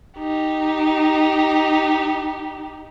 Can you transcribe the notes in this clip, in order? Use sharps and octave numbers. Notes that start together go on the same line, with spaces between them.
D#4 G4